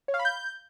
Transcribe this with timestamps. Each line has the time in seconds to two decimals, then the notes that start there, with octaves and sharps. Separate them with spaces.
0.08 C#5
0.14 F5
0.19 B5
0.25 G6